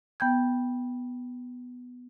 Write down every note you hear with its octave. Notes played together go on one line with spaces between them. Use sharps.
B3 G5 G6 G#6